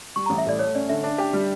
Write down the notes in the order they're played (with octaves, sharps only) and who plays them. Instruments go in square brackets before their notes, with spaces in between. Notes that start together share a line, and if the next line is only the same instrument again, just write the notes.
[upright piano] G3 [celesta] C#6
[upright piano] A1 [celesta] A#5
[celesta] E5
[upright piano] A2 [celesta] D5
[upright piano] A3 [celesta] C#5
[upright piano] C#4 [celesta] D5
[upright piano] D3 [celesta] E5
[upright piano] D4
G4
G3